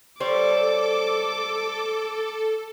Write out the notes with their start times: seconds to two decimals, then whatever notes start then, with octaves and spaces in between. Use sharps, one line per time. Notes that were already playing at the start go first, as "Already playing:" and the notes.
0.20 G3 A4 C5 C#5 D6